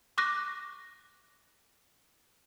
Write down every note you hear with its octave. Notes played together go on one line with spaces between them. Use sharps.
C#6 D6 F#6 A#6